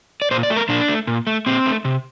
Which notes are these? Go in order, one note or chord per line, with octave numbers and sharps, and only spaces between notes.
D5
A#2 C5
D5
A3
A#4
A#2 D4
A3
A#2
A3
A#2 C4
A3
C3